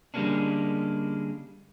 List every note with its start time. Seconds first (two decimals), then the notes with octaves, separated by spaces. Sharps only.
0.14 D3 G3 G#3 A#3 C#4 D4